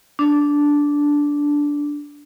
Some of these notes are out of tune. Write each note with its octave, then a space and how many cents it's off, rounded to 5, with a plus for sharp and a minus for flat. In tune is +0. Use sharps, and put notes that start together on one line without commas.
D4 -10